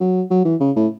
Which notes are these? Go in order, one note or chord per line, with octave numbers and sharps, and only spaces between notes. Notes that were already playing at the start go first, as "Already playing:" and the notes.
F#3
F#3
E3
C#3
A2